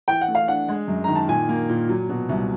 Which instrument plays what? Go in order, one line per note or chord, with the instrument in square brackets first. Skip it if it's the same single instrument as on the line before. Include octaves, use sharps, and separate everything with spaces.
[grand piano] E3 [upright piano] G5
[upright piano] F#5
[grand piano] A3
[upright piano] F5
[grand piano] D4 [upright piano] F#5
[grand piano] G#3
F#2
[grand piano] D#3 [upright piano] A#5
[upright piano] A5
[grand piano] A#2 [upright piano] G#5
[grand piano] A#3
A#2
F#3
B2
C2